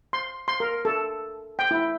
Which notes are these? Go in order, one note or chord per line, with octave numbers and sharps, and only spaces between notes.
C6
C6
A#4
A4
G5
E4